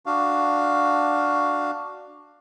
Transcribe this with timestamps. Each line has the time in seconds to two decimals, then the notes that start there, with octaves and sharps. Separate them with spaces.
0.06 D4 F#4 F5